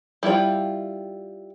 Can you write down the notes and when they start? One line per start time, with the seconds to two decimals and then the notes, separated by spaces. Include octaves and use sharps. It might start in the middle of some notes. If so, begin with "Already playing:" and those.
0.23 G3 E4 F4 G5